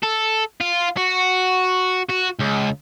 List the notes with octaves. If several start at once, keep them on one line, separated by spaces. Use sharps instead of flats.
A4
F4
F#4
F#4
C#2